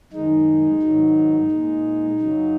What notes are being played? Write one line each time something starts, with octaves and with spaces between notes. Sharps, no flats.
F#2 D#3 G#3 D#4
G#2 D#3 F#3
A#2 G#3
F#2 C#3 F#3